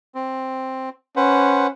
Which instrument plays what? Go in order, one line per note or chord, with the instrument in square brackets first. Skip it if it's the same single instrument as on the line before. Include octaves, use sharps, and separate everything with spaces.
[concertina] C4
[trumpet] C#4 [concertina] B4 C5 F#5